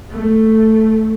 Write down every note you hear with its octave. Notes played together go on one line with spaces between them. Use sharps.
A3